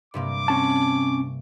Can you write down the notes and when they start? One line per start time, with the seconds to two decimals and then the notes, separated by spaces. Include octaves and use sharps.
0.14 G2 C3 A#3 D6
0.48 C4 C#4 A5